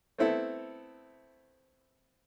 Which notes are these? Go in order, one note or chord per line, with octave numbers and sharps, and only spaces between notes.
A3 B3 C4 E4 A4